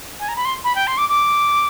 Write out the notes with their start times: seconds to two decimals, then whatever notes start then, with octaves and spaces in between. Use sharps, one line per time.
0.20 G#5
0.28 A#5
0.36 B5
0.45 C6
0.64 B5
0.76 G5
0.87 C6
0.98 D6
1.09 D6